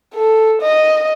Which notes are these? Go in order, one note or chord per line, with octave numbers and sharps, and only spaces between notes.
A4
D#5